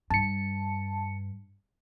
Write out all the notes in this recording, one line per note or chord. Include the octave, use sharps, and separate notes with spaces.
G2 A5 C#7